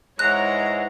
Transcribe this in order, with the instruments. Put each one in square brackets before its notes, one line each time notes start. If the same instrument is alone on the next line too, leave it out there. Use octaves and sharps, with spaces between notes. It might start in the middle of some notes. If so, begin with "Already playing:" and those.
[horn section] G#2 E3 G#3 [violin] C#5 F#5 [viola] A#5 [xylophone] F#6